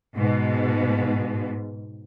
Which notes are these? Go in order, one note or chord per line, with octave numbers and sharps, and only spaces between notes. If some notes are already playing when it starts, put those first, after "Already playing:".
G#2 B2